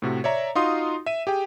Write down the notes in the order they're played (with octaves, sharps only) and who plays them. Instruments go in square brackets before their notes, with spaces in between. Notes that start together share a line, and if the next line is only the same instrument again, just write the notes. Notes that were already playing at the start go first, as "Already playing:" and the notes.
[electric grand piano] A2 C3 F#4
C#5 D5 E5 A#5
D#4 F4 F#4 F5 C6 D#6
E5 D#7
G4 G#4 G5